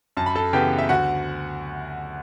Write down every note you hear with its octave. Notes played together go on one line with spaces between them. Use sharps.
F#2 A5
B5
A4 A5
C#3 E3 B3 G4 G5
E5
D2 F#4 F#5